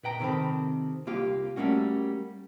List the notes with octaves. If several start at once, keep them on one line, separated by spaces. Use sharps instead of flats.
A#2 B4 G5 A#5
C3 D#3 C4 A4 B5
C2 A#3 F4 G4 F5
G3 A3 A#3 C#4 F#4